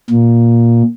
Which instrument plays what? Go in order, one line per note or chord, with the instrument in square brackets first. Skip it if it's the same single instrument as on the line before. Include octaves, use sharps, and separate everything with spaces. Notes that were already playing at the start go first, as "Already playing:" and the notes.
[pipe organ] A#2